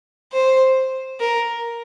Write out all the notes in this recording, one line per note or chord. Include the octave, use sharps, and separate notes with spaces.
C5
A#4